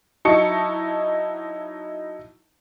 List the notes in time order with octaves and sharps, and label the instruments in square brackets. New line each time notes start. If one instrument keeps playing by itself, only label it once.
[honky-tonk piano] F#3 D#4 E4 A5 C#6 C#7